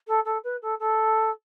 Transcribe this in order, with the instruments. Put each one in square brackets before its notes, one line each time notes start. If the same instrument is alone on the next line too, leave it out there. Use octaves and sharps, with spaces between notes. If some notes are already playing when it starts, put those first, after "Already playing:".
[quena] A4
A4
B4
A4
A4